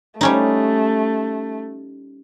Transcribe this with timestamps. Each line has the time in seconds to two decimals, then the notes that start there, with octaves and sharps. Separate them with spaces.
0.21 G3 A3 C#4 D#4